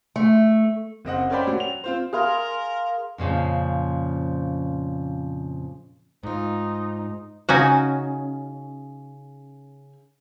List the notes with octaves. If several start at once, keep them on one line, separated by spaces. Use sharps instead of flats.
A3
F#1 C4 D#5 F#5
C#4 A#4 C5 D5 G5 B5
F#3
F7
C4 F4 C5
G#4 A#4 F5 C6
F2 A#2 C#3 F3
G#2 D#4 F4
C#3 C#4 D#4 F#4 G#5